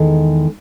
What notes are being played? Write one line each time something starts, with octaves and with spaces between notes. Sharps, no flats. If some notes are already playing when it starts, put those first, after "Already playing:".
Already playing: E2 D#3 G#3 A4